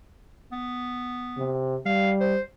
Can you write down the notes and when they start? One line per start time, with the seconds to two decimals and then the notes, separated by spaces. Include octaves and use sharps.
0.52 B3
1.37 C3
1.86 G3 F5
2.20 C5